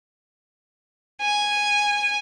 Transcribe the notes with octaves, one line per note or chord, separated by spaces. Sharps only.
G#5